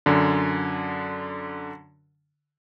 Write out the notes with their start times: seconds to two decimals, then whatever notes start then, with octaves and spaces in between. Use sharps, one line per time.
0.06 F#2 D3